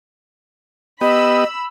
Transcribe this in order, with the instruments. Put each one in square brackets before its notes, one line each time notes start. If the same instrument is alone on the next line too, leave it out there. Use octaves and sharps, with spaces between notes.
[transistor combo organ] B3 G4 D#6 [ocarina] D#5 [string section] B5 E6